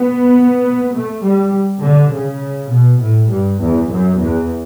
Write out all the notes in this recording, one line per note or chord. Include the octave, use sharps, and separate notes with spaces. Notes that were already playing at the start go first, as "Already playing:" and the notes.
Already playing: B3
A3
G3
D3
C#3
B2
A2
G2
E2
F#2
E2